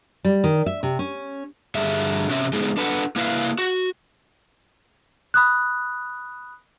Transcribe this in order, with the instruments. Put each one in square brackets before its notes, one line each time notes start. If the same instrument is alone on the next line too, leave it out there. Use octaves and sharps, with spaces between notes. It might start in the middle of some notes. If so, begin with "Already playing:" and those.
[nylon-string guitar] G3
D#3
E5
C3
C#4
[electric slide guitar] G2 D3 G#4 E5
C3 C#4 E5
G#3 A3 B3 D#4 G#4
D4 A4 B4 F5 F#5
A#3 E4 B4 E5 F5
F#4
[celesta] B5 D#6 F#6